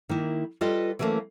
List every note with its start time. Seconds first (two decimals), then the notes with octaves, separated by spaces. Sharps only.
0.09 D#3 A#3 E4
0.61 G3 F4 A4 B4 D#5
0.99 E3 F#3 G3 A3 A#3 C#4